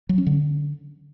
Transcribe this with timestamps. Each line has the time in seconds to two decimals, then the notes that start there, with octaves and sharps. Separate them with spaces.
0.09 F#3
0.18 C#4
0.27 D3